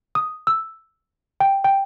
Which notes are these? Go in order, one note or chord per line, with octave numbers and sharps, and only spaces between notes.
D#6
E6
G5
G5